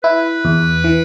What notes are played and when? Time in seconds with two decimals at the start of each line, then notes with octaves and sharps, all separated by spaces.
0.03 E4 B4
0.45 E2
0.84 E3